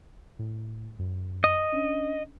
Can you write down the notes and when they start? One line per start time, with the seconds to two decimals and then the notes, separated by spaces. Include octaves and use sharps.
0.39 A2
0.99 F#2
1.44 D#5
1.72 C#4 D4